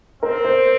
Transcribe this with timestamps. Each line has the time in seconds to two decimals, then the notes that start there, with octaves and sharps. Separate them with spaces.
0.23 C4 A#4
0.44 C5